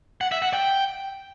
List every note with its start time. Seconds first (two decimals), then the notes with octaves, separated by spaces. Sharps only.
0.21 F#5
0.32 E5
0.42 F#5
0.54 G5